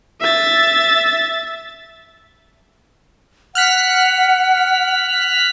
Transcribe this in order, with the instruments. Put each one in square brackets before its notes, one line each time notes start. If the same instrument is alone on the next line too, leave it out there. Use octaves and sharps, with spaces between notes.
[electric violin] E5 A6
[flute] F#5 [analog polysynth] F6 F#6 B6